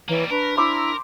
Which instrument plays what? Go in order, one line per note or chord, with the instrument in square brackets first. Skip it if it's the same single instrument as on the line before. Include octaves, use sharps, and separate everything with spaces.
[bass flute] E3 [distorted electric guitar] G3 A#3 [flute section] C#5
[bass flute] D4 [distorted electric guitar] A#4 [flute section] B4 C#6
[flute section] E4 E6 [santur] C5 B5 D6